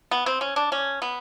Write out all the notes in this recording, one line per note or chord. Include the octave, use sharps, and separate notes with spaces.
B3
C4
C#4
D4
C#4
B3